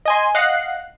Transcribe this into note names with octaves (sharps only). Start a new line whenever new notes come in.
D#5 G#5 C6
D#5 F5 F#5 F#6 C7